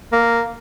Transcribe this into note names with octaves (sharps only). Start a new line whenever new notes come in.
A#3